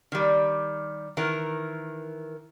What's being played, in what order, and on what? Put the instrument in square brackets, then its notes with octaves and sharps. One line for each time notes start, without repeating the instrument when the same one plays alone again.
[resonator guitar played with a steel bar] D#3 G3
D#3 E3 A#4